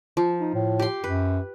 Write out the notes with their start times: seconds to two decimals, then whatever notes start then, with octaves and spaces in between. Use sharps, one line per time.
0.17 F3
0.40 D#4
0.54 A2
0.79 G4 C6
1.04 F#2 B4